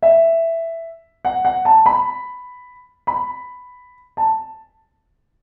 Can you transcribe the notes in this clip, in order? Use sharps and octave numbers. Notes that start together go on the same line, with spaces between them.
E5
F#5
F#5
A5
B5
B5
A5